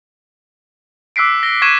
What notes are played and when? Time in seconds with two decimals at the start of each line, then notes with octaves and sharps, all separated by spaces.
1.16 D6 E6 F#6 B6 C7 D7
1.43 A#6 G7
1.62 C#6 F#6 G#6 B6 D#7 E7